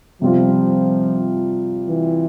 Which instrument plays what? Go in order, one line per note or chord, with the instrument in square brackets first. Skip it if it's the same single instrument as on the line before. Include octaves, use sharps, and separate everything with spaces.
[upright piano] C3 G3 C4 F4 [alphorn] F3
[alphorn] E3